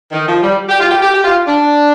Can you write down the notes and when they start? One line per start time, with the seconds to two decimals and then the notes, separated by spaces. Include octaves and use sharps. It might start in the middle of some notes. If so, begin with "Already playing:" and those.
0.12 D#3
0.27 F3
0.42 G3
0.68 G4
0.79 F4
0.90 G4
1.02 G4
1.13 G4
1.24 F4
1.46 D4